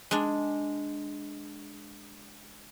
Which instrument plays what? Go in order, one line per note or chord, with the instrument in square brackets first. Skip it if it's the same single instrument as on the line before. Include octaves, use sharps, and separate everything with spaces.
[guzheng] G#3 D4